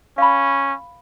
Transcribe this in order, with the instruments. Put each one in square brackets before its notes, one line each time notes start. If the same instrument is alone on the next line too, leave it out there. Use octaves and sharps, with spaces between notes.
[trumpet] C#4 [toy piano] F5 B5